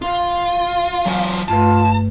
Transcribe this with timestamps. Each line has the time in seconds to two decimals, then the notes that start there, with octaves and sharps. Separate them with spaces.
0.02 F4 F5
1.05 F#3 F4 G#5
1.48 G2 A3 F4 B4 A5